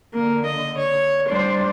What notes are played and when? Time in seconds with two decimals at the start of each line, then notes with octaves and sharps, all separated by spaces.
0.14 D3 A#3
0.45 D#5
0.78 C#5
1.28 G3 D4 C5 D5